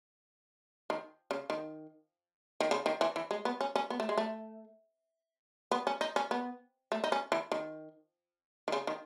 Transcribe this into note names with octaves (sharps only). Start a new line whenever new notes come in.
D#3
C#3
D#3
D#3
C#3
D#3
E3
E3
G#3
B3
C#4
C#4
B3
A3
G#3
A3
B3
C#4
D#4
C#4
B3
A3
D#4
C#4
E3
D#3
D#3
C#3
D#3